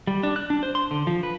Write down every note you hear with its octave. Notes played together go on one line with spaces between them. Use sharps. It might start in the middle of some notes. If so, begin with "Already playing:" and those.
G3
D4
F#6
D4
C5
C6
D3
F3
B4